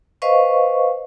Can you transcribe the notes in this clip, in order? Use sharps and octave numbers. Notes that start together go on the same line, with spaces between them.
B4 C5 D#5 F5 C#6